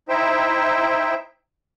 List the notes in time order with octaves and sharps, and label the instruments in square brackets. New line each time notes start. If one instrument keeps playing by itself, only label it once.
[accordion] D#4 E4 C5 E5 G5